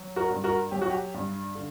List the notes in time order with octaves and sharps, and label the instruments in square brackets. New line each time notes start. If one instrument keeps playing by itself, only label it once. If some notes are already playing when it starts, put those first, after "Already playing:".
Already playing: [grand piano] F#3
F#4 A#4
G2
F#4 A#4
F#3 G4
F#4
G4
G2
D3